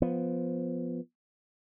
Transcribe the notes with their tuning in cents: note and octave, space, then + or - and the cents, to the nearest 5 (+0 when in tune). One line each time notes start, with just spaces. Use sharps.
F3 +0 B3 +0